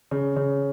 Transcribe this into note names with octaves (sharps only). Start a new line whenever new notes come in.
C#3
C#3